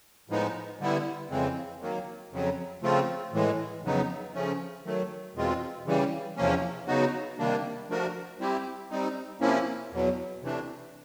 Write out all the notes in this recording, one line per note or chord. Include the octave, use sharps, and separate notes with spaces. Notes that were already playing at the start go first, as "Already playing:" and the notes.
A2 F3 G#3 B3 D#4
D3 G3 B3 E4
F2 C#3 E3 G#3 C4
D#3 F#3 A#3
F2 C#3 F#3
C#3 F3 A3 C4 F4
A2 E3 G#3
F2 C#3 F#3 B3 D#4
C#3 F3 A3 C#4
D#3 F#3 A3
E2 B2 G#3 C4 F4
C#3 E3 G3
E2 C3 F3 A#3 C#4
C#3 F#3 B3 D#4 F#4
C3 D#3 G3 A#3 D4
F3 A3 D4 F#4 A#4
G3 C4 E4 G4
G3 C4 D#4
C3 F3 A#3 C#4 E4
E2 B2 F#3
C3 E3 A3 D4